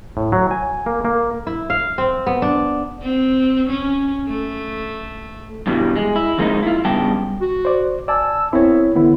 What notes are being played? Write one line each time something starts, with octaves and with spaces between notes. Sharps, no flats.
A2
F#3
G#5
A#3
A#3
E4
F5
C4
B3
D4
C4
C#4
A3
G2 B2 E3 G3
G#3
E4
F2 F3 G#3 A#3 C4 D#4
E4 F4
G2 C#3 G3 B3 G5 A5
F#4
C5 D5
D5 G#5 A5 E6
B3 C4 E4 A#4 C#5 E5
D3 E3 B3 E4